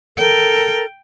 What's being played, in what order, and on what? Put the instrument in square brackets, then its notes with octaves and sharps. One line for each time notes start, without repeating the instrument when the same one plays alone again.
[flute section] A4 A#4 [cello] G5